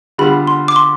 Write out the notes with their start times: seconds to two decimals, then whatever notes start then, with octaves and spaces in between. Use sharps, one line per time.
0.18 D3 G3 B3 F4 B5
0.47 C6
0.68 D6
0.76 C6